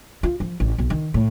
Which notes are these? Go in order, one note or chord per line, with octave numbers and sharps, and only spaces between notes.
F4
F3
A1
B1
D#3
A2